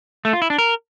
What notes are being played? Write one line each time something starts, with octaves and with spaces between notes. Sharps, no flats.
A3
F4
E4
D4
A#4